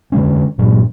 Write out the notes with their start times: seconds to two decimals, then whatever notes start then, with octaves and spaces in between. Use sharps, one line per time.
0.12 D3 F3 G#3 C#4
0.58 G2 A#2 F#3 D4